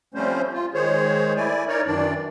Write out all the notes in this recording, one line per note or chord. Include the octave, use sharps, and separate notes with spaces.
F3 G3 A3 C4 C#4 C5
F4
D#3 G#3 G#4 C5 C#5
A3 E4 D5 G#5
D#4 A#4 C#5 D5
F#2 D#3 E3 D4 D5